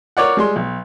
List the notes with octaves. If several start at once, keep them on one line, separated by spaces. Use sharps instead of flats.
A#4 C#5 D5 F#5
G3 G#3 C6
B1